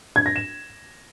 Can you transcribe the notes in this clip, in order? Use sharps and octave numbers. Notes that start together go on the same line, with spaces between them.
G#6
A#6
E7